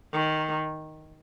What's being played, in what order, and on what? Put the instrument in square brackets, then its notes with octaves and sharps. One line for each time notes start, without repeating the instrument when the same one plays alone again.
[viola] D#3